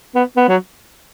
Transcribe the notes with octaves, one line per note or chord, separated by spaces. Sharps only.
B3
B3
F#3